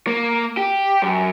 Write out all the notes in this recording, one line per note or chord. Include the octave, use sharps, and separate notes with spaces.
A#3
G4
F#2